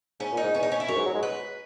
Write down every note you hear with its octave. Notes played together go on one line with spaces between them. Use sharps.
G#2 C#4
A#2
D#4
G#2
E2 C#4
D#4
C#4
E4
F#2 C#5
G#2
F#3
G#3
B4